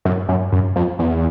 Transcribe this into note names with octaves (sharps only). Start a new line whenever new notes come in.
F#2
F#2
F#2
F2
E2